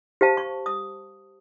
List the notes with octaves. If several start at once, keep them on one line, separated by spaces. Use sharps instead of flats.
G4 C5 F5 A5
C#6
D#6